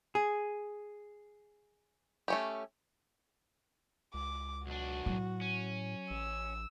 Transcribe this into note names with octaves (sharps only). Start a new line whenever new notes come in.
G#4
A3 C#4 G4
C#2 D6
B1 D4 F#4
A2 F#3
C#4
A1 E6